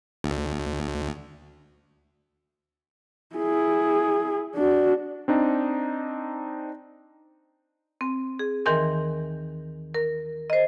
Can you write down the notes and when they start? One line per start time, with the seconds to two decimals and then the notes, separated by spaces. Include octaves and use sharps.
0.24 D2
3.35 E4 G#4
4.55 D4 F#4
5.28 C4 D4 D#4
8.01 C4
8.39 G#4
8.66 D#2 D#3 E3 A#4 G#5 C6
9.94 A#4
10.50 C5 D#5